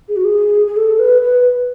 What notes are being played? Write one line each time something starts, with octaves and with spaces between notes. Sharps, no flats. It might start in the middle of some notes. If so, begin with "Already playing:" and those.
G#4
F#4
G#4
G#4
A4
B4
B4